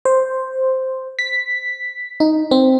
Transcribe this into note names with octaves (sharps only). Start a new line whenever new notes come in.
C5
B6
D#4
C4